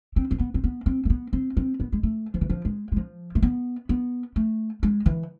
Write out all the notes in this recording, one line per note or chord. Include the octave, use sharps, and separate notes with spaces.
C4
C4
B3
C4
B3
C4
A3
B3
C4
C4
B3
G#3
A3
F3
E3
F3
G#3
G#3
F3
A3
B3
B3
A3
G#3
E3